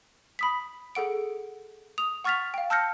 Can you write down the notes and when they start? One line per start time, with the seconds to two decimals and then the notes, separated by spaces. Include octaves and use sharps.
0.39 B5 D#6 B6
0.95 G#4 A4 F#5 D7
1.98 D#6 F7
2.24 F#5 C#6 F6 A6 B6 F7
2.54 F5 G5
2.70 A5 E6 F6 G6 A#6 C#7